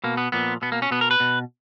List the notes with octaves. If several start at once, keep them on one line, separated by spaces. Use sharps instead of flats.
B2 A#3
B3
A#2 F3 B3
B2 B3
A#3
C#4
B2 B3
A#4
B4
B2